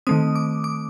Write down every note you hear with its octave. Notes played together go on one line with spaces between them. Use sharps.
D#3 A3 C4 D#6
D6
D6